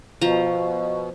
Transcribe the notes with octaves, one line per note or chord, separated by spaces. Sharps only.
B2 F3 A#5